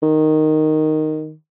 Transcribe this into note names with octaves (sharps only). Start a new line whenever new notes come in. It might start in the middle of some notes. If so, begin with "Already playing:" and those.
D#3